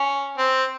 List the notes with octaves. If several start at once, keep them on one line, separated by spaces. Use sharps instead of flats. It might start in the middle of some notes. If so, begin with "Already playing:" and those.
Already playing: C#4
C4